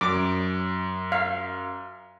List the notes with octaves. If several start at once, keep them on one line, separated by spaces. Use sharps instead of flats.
F#2 D6
F5